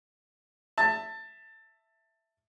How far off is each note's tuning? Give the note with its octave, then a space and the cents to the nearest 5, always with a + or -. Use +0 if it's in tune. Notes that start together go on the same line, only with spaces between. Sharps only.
E5 +0 A5 +20